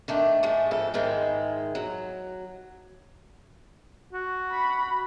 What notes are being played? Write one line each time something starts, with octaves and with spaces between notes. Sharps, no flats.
D#3 A3 D4
A2 G#3 A3
F2 G#2 A4
G#2 D#3 G#3 E4
F#3
F#4
B5